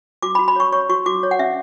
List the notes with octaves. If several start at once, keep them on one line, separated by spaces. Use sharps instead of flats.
F#4 D6
B5
F#4
B5
C#5 C#6
C#5 C#6
F#4 C#6
F#4 D6
C#5
F#5
C#4 E5